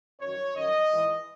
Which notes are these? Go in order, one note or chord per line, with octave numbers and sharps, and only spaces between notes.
F#2 D#3 F#3 C#5
F#2 D#3 F#3 D#5
G#2 E3